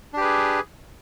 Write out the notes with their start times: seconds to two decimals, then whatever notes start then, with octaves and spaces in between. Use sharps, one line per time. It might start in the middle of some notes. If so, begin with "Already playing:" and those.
0.14 D4
0.17 G4
0.20 B4
0.24 G#4